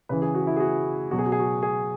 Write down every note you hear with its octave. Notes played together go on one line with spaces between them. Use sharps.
C#3 E3 B4
G#4
F#4
E4
G#4
F#4
B2 F#3 F#4
G#4
F#4
G#4
F#4
G#4